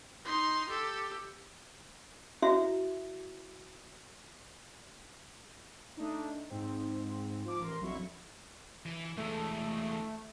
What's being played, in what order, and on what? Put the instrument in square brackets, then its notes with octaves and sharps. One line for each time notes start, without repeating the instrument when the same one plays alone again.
[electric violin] D#4 C6
G4 A4
[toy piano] E4 F#4 E5
[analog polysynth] A3 D4 D#4
G#2 C4
F3 D6
A1 A#4 A#5 C6
A#1 F2 F#3 E4 C#6
[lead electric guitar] E3
[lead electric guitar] E3 G#3 [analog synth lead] A3